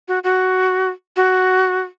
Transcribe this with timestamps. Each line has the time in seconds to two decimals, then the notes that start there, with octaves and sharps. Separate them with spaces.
0.08 F#4
0.24 F#4
1.16 F#4